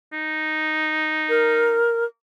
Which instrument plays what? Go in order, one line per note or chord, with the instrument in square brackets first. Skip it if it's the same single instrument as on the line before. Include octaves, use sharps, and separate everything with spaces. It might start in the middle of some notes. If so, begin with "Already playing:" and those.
[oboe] D#4
[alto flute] A#4